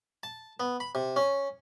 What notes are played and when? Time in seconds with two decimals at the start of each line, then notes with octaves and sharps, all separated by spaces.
0.23 A5
0.60 B3
0.80 B5
0.95 C3
1.16 C#4